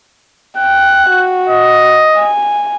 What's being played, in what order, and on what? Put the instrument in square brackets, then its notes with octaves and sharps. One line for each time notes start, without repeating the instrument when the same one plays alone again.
[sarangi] G5 [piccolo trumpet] F#6
[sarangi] F#4
[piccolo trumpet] D#5
[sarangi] G#5